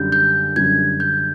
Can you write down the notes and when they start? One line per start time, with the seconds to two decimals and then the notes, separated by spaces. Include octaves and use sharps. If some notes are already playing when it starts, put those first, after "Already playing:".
Already playing: F#2 D3 G3 G6
0.12 G6
0.56 F#2 D3 G3 G#6
1.00 G6